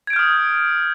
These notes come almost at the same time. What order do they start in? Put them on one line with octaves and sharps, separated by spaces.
G#6 D7 G6 F6 D#6